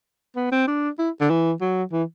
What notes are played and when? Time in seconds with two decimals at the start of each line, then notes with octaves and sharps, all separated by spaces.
0.36 B3
0.52 C4
0.68 D4
0.99 E4
1.21 D3
1.30 E3
1.61 F#3
1.92 E3